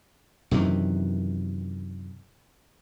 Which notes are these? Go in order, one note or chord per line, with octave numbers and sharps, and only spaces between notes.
F#2 C3 D#3 E3